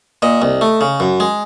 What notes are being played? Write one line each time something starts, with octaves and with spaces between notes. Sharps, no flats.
A#2 D#5
C2
A3
C#3
F#2
G#3